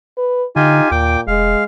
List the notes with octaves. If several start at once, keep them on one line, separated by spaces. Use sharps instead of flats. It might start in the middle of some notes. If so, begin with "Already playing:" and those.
B4
D3 D#4 F4 G4 G#5
D#2 A#2 G5 D6
E1 G#3 F5